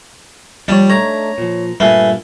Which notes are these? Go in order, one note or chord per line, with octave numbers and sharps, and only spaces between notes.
D#2 F3 G3 D4 C#5
A3 D4 D#4 C#5 A#5
A#2 F3
G2 A#2 A3 B4 F5 G#5